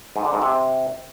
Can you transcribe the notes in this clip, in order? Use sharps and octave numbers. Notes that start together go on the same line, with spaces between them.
G#2
D3
G#2
C3